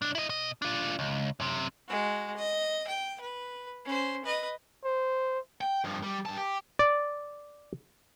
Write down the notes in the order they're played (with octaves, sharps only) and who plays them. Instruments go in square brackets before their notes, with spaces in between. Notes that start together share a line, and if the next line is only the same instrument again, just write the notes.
[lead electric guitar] B1 D4
E4 D#5
B2 D#5
D4 F4
C#2
F#2 C3
[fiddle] G#3 F#4
D#5
G5
B4
C#4 C5
B4 D#5
[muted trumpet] C5
[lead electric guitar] G5
G2 F3
G3
G2 A5
G4
[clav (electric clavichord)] D5